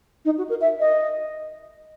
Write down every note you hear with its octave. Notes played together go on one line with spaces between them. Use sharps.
D#4
F#4
A#4
E5
D#5